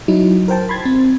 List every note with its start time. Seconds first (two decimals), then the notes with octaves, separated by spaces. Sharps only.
0.08 F#3 D#4 E4
0.48 A#4 C5 G5 A5
0.69 B5 C6 G#6 A6
0.85 C4